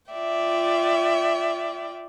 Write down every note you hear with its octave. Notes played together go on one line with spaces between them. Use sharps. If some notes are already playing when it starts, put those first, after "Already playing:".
F4 D5 E5 G5